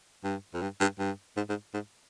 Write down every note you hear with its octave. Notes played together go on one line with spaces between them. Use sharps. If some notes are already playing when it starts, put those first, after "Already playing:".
G2
F2
G2
G2
G2
G#2
G#2
G#2